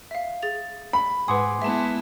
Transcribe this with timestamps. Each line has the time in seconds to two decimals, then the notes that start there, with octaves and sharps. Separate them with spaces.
0.11 E5 F5
0.42 G#4 A6 F7
0.93 B5
1.28 G#2 B4 F#5 G#5 C6 D6 D#6
1.62 G#3 B3 E4 E5 A5